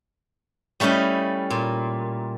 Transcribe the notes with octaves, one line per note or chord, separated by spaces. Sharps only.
G3 A3 C#4 E4 D#5
A#2